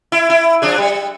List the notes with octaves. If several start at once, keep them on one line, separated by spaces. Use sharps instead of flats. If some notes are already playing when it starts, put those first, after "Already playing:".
E4
E4
F3 D4 G#4
G3